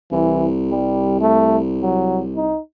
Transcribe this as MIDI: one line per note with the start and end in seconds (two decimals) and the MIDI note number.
0.12 2.55 36
0.12 0.48 52
0.71 1.16 55
1.21 1.58 57
1.82 2.21 54
2.36 2.59 63